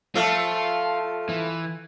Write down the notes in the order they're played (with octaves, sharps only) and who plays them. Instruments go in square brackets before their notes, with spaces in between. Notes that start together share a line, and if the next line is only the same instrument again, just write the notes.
[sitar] F3 A3 [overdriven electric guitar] F4
[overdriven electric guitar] E3